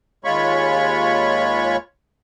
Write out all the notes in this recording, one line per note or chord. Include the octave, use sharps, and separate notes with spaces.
D#2 G#3 F4 C#5 B5 C#6